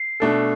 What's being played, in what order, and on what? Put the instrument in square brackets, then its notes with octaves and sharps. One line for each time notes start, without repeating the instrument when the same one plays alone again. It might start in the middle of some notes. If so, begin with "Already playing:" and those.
Already playing: [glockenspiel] C7
[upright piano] B2 A3 D4 A4